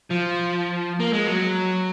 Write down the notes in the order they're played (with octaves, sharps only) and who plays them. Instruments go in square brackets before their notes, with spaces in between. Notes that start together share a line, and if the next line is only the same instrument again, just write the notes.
[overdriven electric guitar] F3
A#3
G#3
F#3